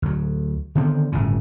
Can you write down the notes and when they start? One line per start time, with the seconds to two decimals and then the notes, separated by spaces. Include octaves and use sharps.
0.02 D2 F#3
0.75 D3 D#3 B3 C4
1.12 G1 A2 C#3